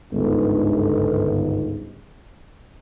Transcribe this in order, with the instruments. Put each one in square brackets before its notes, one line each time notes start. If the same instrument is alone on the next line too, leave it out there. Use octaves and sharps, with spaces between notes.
[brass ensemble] G1 C#2 G#2